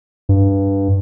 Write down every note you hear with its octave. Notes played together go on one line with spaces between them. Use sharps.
G2